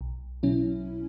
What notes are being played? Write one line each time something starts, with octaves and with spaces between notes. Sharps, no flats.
B1
B2 F#3 C#4 E4